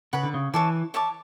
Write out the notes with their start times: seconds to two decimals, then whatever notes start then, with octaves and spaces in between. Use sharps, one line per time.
0.13 C#3 B4 F#5 B5
0.23 D3
0.34 C#3
0.54 E3 C#5 E5 A5 D6
0.94 C#5 E5 A5 D6